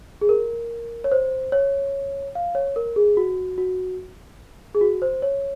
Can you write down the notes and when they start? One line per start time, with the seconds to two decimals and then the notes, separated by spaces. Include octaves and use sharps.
0.21 G#4
0.29 A#4
1.04 C#5
1.12 C5
1.52 C#5
2.35 F5
2.55 C#5
2.76 A#4
2.96 G#4
3.17 F#4
3.58 F#4
4.75 G#4
4.81 F#4
5.02 C5
5.22 C#5